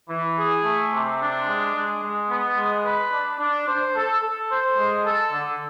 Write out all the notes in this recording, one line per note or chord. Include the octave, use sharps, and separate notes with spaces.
E3
G#4
A3
C3
D4
G#3
G#3
G#3
B3
G#3
B4
D4
D4
C5
A4
A4
C5
G#3
A4
D3